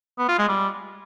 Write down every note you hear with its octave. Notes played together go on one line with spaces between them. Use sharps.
B3
F4
G#3
G3